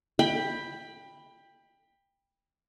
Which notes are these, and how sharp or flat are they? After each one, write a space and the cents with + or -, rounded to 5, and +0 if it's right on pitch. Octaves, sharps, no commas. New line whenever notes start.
G5 +20 B5 -5